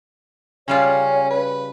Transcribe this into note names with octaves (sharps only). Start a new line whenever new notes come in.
C#3 G3 C#4 F4 C#5
B4